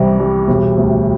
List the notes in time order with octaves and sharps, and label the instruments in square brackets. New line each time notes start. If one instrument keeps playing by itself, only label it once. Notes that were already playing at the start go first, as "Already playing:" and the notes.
Already playing: [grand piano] C2 C3 E3 G3
G3
E1
D2